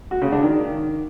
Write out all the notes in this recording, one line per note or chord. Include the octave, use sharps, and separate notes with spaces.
F#4
C#3
D4
D#3